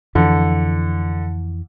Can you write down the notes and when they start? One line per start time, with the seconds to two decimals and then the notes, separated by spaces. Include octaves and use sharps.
0.15 F2 D3 E3